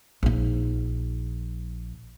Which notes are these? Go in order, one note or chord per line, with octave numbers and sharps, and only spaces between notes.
A#1 D#4